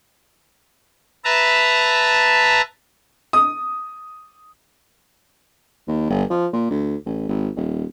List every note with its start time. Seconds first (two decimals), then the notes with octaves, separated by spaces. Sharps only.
1.25 B4 E5 A5 A#5
3.33 D#6
5.88 D#2
6.10 G1
6.30 F3
6.53 A#2
6.70 D2
7.06 A1
7.29 G#1
7.56 D#1